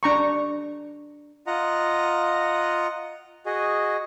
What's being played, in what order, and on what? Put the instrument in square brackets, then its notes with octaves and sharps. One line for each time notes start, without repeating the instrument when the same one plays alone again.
[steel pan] D4 A#5 C#6
[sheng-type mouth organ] F4 D#5 F#5 A#5
F#4 G#4 D#5